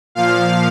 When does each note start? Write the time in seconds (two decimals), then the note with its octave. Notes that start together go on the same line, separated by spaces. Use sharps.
0.15 A#2 F3 F5